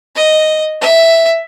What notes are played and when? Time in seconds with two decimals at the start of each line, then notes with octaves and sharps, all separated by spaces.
0.16 D#5
0.81 E5